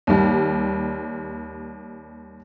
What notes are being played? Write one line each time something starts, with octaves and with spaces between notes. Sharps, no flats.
D#2 G3